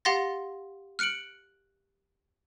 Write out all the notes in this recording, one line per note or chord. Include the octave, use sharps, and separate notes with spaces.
G4 F5 F#5 C6 A6 A#6
F6 F#6 C#7 D7 F#7